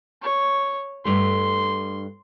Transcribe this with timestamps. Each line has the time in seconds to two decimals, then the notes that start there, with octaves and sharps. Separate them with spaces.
0.22 C#5
1.05 G2 A3 C6